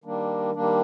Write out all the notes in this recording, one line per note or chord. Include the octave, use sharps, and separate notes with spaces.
D#3 G3 A#3 D4
D#3 G3 A#3 D4